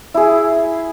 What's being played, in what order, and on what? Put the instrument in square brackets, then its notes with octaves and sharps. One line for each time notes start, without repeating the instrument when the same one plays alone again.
[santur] E4 G#4